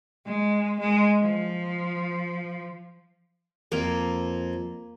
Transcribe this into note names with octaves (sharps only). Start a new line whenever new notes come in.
G#3
G#3
F3
F2 A#3